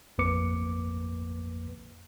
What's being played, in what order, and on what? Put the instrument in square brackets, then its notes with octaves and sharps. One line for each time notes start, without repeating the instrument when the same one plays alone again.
[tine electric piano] A1 F2 A#3 B4 D6 C#7